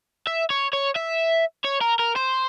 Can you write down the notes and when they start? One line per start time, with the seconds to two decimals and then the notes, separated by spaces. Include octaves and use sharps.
0.27 E5
0.50 C#5
0.73 C#5
0.95 E5
1.64 C#5
1.81 A#4
1.99 A#4
2.16 C5